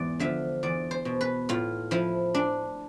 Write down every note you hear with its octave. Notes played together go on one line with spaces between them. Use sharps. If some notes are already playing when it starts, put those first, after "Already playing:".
Already playing: E2 G#2 D5
D3 F3 E5
E2 D5
C5
B2
B4
A2 F4
F3 E4
D4